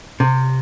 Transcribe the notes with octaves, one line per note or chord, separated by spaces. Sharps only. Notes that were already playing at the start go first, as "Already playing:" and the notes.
C3